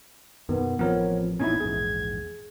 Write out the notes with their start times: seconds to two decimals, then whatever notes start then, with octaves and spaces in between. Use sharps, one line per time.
0.49 F#2 B2 D#3 B3
0.79 A1 F3 B3 C4 A#4 C#5
1.40 A1 A#2 B3 C#4 D#4 E4 G#6
1.60 A#1 E2 G#2 G#4